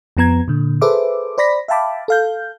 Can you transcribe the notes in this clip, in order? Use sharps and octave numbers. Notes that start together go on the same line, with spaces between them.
F2 F3 B3 A#5 G#6
A#2 D3
G#4 A4 B4 C5 E5 D6
C5 D5 B5 A#6 B6
E5 F5 G5 A5 B5 D6
A4 F5 G6